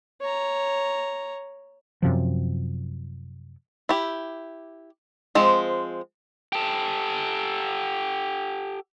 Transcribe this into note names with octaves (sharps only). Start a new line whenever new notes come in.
C#5 A#5
F#2 C3 F3
E4 G4
F3 G#3 C4
G4 A4